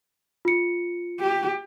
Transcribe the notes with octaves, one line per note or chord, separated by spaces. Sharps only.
F4 C#7
G4